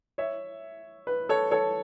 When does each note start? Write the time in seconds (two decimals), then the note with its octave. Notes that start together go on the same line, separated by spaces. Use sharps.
0.18 C#5 E5
1.07 B4
1.29 A4 C#5
1.51 A4 C#5